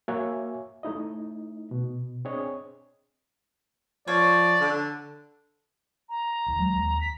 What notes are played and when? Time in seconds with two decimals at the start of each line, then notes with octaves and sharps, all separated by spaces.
0.08 A#3 F#4 C#5 E5 G#5
0.83 A3 D#4 E4 D#5
1.71 B2
2.25 C4 D4 G#4 C#5 D#5
4.08 F3 C#5 D5
4.61 D3
6.09 A#5
6.46 D1 D#2
6.59 F#3 G#3
6.75 D#2
7.01 B6